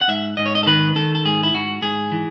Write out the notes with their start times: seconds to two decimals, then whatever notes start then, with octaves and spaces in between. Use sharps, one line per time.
0.01 F#5
0.08 G#2 E5
0.37 G#2 D#5
0.46 C#5
0.55 D#5
0.63 A4
0.66 D#3 B4
0.96 D#3 A4
1.15 A4
1.25 G#2 G#4
1.43 E4
1.54 G#2 F#4
1.82 G#2 G#4
2.12 E3